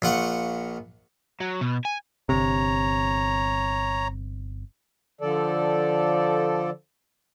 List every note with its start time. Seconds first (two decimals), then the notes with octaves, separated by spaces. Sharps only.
0.02 A#1 F4 F#5 C#6
1.40 F#3
1.61 B2
1.85 G#5
2.29 G1 C3 C#5 A#5
5.21 D3 F3 A4 D5